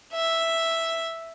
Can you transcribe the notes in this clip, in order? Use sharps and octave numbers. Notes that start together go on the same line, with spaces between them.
E5